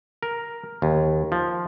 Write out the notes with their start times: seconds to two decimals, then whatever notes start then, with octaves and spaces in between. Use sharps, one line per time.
0.23 A#4
0.82 D#2
1.32 F3